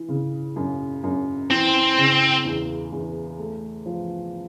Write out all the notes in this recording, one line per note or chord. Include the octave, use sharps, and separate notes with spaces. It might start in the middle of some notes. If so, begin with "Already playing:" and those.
Already playing: E3
C#3
F#2
F#2
E3 C4
C#3
E2
E2
A3
F3